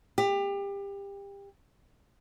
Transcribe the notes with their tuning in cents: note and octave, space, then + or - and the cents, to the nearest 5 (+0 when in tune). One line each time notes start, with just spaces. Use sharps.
G4 +25